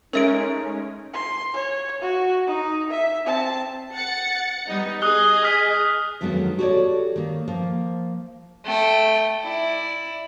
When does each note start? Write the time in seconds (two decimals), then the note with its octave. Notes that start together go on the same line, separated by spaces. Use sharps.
0.13 G#3 A3 C#4 D#4 A#4 E5 D7
1.13 C6
1.54 C#5
2.01 F#4
2.47 D#4
2.89 E5
3.26 C4 A5
3.94 F#5 A6 C#7
4.68 G3 B3 D#4
5.02 G#4 D#5 D#6 F#6 G7
5.43 D#6 F6 B6
6.21 F2 D3 D#3 F#3 G#3 B3
6.58 F#4 G4 A4 A#4 C#5 D5
7.16 D#3 A#3
7.48 F3 A#3
8.65 A3 G5
9.42 E4 D5